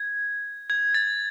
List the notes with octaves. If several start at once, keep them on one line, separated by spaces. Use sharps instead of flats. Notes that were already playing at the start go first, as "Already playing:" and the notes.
Already playing: G#6
G#6
A6